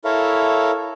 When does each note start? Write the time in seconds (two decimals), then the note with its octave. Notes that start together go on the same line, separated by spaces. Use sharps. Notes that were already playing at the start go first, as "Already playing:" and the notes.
0.05 E4 A4 A#4 C#5 E5 F5